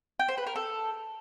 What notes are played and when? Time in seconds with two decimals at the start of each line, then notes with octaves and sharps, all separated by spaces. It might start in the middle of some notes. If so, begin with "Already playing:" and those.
0.19 G5
0.28 C5
0.38 B4
0.47 A#4
0.56 A4